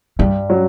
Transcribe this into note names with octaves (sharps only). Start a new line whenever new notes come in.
G2 G3
F#3 C#4 F#4